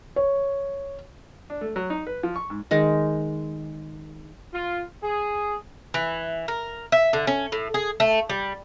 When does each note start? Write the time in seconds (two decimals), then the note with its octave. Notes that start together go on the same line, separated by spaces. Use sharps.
0.16 C#5
1.50 D4
1.61 A3
1.76 F#3
1.90 D#4
2.07 B4
2.23 F3
2.36 C#6
2.50 G#2
2.71 D#3 G#3
4.53 F4
5.03 G#4
5.94 E3
6.48 A#4
6.92 E5
7.13 D3
7.27 C#4
7.52 A2
7.74 G#4
8.00 A3
8.29 G3